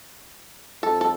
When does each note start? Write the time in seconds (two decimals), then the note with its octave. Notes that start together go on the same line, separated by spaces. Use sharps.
0.83 F2 A4
1.01 A4